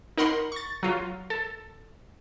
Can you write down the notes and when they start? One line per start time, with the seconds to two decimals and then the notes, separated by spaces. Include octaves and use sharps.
0.18 D#4 A#4 F#5 B5 C6
0.52 C#6 A6
0.83 F#3 F4 F#4
1.30 A4